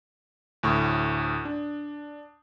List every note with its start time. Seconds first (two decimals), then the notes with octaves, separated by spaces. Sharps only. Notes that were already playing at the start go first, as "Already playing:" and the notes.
0.63 D2 A2 C#6 D#6
1.45 D4